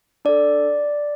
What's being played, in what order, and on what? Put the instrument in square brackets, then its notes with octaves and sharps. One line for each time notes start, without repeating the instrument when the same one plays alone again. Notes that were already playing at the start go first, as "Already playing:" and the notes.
[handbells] D4 A4 D5